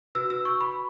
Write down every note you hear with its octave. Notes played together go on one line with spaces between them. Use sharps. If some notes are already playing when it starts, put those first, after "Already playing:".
F#4 B4 E6
E6
C#6
B5